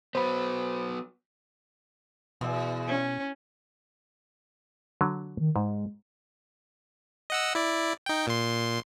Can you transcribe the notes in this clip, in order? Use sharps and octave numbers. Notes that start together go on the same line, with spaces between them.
F#3 B3 C5 B5
E2 B2
C#4
D3 F#3
D#3
G#2 G#3
D#5 F#5 E6
E4 D5
D#4 G5
A#2 C6